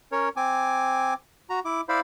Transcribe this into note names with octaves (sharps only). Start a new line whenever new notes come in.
C#4 A#4 C#5
C4 G#5 D6
F#4 A#5
E4 D6
E4 C5 D5 F5 B5